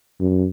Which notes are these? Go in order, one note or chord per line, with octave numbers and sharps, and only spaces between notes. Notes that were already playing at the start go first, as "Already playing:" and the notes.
F#2